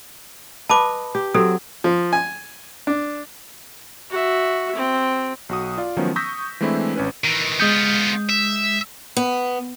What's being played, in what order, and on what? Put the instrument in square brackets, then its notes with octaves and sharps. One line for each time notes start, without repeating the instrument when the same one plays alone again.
[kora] B4 D#5 [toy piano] A5 B5 D6
[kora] G4
[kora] F#3 C4 [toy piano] G4 A4
[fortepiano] F3
G#5
D4
[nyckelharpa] F#4 E5
C4
[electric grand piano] B1 F#4 D#6
F4 D5 F5
D#3 F3 F#3 A3 B3 C#4
C#6 D#6 E6 G6 A#6 B6
E3 G#3 A3 C4 D4 E4
G#1 C#4 B4
[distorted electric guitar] D#3 E3
[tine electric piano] G#3 D#6 G6 [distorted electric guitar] B3 F4
[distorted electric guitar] E5
[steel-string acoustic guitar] B3